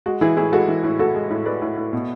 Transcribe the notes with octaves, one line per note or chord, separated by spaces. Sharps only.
G#3 F#4
E3 E4 G#4
A2 E4 G#4
G#3 F#4 A4
E3
A2
A2 F#4 A4
G#3
A2
G#3 B4 D5
A2
A2
B2